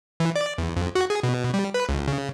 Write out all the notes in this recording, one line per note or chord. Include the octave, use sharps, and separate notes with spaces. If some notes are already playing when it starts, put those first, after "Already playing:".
E3
D5
E2
F2
F#4
G#4
B2
G3
B4
C#2
C#3